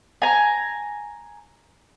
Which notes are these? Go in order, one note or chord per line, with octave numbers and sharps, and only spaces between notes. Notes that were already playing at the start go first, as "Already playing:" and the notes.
G#5 A#5